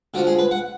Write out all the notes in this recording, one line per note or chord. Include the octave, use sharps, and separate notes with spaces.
D3 F3 F#4
G#4
B4
F#5